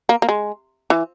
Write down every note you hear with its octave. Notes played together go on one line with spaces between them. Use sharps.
A#3
A#3
G#3
E3